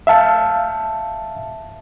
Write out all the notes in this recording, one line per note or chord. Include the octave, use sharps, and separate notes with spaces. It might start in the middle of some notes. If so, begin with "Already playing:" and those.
E5 F5 A5